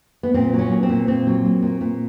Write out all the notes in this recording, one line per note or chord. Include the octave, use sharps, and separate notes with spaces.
B3
A#2 C4
F#3
C#4
A#3
C4
A#2
A#2 C4
F#3
A#3
A#2
A#2